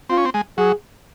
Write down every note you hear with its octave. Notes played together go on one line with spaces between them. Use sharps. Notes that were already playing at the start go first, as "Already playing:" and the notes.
C4 F4
C#4
C4
G#3
F#3 G#4